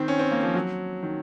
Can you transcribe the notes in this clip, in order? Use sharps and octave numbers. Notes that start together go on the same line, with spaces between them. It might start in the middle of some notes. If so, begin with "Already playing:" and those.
Already playing: D#3 C4
C#4
C4
A#3
F3
F#3
D#3